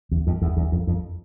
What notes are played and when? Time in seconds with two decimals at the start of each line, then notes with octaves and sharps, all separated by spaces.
0.11 E2
0.27 F2
0.42 E2
0.57 E2
0.72 F2
0.87 F2